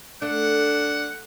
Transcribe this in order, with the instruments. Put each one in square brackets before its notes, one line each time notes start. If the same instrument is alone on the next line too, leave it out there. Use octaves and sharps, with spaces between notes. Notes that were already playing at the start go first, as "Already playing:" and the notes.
[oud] A3 [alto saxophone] D4 [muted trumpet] F#5